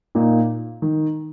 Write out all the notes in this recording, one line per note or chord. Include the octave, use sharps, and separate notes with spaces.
A#2 A#3 D#4
D#3